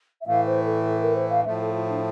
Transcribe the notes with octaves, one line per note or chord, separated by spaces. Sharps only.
E5
A2 E3 A3 F5
C5
A4
A4
A#4
C5
F5
A2 F3 A3 E5
A4
F4
D4